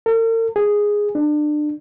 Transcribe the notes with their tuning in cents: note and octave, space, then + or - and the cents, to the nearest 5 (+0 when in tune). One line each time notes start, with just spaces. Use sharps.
A#4 -45
G#4 -5
D4 +30